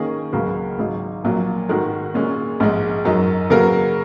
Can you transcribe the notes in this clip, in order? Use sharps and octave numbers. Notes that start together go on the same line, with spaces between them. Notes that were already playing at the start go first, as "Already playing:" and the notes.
Already playing: D#3 A#3 C#4 G#4 D#5
C#2 C#3 F#3 A#3 F#4
G#1 G#2 F#3 D#4
A#1 A#2 F#3 A#3
G#2 D#3 G#3 F#4 A#4
A#2 G#3 C#4
A#1 G#2 G#3 D#4
F#2 F#3 D#4
C#3 F#3 A#3 F#4 A#4